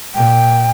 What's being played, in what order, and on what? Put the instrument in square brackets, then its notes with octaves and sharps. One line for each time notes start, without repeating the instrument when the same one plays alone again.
[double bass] A#2 [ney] G5